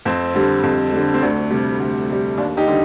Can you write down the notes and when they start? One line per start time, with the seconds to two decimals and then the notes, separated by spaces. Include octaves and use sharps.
0.05 F2 C4
0.34 D3 G3
0.63 F2
0.93 D3 G3
1.14 C4
1.22 D2 D4
1.51 C3 G3
1.80 D2
2.09 C3 G3
2.38 D#2 D4
2.57 D#4 G4
2.67 D3 G3